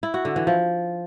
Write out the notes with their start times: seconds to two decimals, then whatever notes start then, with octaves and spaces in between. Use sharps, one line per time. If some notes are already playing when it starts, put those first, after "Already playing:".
0.03 E4
0.14 F#4
0.25 D3
0.36 E3
0.47 F3